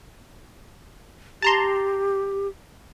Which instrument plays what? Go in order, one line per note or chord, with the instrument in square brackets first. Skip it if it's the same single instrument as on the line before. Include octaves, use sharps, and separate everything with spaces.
[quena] G4 [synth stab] A5 A#5 C6